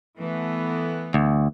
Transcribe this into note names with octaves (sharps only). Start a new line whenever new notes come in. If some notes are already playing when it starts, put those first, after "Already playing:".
E3 A3 B3
D2